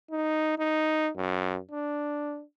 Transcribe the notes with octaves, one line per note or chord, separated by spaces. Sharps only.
D#4
D#4
F#2
D4